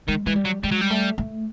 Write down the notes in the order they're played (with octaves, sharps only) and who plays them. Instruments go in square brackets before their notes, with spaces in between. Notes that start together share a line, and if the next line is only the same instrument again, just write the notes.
[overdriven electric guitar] D#3 [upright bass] G#3
[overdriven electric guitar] E3 [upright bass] G#3
[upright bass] G3
[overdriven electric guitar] F#3
[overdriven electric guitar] G3 [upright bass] G#3
[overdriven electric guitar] F#3
G3
[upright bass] A3
A3